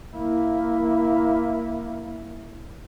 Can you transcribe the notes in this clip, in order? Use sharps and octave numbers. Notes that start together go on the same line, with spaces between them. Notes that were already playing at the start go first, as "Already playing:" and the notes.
A#3 E4